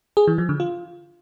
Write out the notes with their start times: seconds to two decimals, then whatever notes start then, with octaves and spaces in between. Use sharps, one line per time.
0.17 G#4
0.28 E3
0.38 F3
0.49 D3
0.60 F4